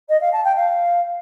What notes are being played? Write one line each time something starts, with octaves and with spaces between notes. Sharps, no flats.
D#5
F5
A5
G5
F5